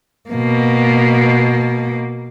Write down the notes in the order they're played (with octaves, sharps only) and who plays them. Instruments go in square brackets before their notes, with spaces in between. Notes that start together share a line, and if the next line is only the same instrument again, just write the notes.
[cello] B2 A#3